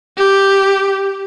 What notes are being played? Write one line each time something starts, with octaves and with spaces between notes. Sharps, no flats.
G4